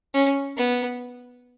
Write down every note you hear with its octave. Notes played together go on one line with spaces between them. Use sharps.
C#4
B3